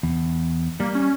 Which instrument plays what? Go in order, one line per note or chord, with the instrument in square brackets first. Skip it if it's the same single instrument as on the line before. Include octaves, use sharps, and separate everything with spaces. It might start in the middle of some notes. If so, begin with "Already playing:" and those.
[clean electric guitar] E2
[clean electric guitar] G3 [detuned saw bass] A#3
[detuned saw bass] C#4